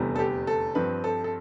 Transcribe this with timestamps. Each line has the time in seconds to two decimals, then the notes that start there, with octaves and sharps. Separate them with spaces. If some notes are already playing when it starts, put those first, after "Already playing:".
Already playing: F1 E2 D3 G3 B3
0.16 A4
0.19 G4
0.47 A4
0.75 G2 F3 C4 B4
1.04 A4
1.24 A4